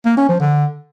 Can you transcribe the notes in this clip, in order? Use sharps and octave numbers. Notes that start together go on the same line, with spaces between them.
A#3
C#4
F3
D3